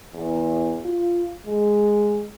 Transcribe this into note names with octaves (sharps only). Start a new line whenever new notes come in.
E2
F4
G#3